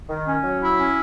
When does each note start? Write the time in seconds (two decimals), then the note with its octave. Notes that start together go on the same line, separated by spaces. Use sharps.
0.09 D#3
0.27 C#4
0.44 F#3
0.62 E4
0.78 C#4